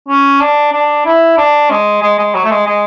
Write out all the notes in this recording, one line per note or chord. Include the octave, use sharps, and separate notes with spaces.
C#4
D4
D4
E4
D4
G#3
G#3
G#3
F#3
A3
G#3
G#3